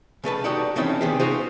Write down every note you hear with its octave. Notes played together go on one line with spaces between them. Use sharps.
C#3 A3 B4 A5
D#4 F#4 G4 A4 D5 F#5
C#3 E3 A3 C4 C#4 D#4
C3 D#3 B3 G4 G#4
D#4 F4 F#4 G#4 C5